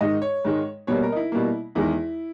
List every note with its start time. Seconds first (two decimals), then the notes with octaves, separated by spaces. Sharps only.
0.01 G#2 D#3 G#3 D#5
0.22 C#5
0.45 G#2 D#3 G#3
0.87 B2 G3 A#3 C#5
1.03 A#4
1.12 D#4
1.16 E4
1.32 B2 G3 A#3
1.75 E2 D#3 G#3 E4